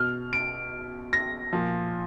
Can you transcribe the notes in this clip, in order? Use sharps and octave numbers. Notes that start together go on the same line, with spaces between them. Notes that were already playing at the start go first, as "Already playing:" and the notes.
Already playing: B2 F6
D7
A#6
A#2 F3